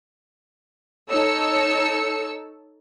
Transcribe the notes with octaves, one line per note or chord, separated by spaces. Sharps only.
D#4 A4 C#5 A5 E6 C#7